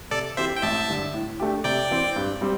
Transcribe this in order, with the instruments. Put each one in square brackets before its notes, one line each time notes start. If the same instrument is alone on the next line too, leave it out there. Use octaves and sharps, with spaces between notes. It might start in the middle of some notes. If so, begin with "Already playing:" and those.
[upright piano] C3 [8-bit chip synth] A4 D5
[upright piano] E3 C4 G4 [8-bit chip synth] C5 E5
[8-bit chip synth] G5
[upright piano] A1 [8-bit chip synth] E5 A5
[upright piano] G2 D3
A2
A3 D4 G4
[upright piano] C3 [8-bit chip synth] D5 G5
[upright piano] E3 C4
G2
G3 C4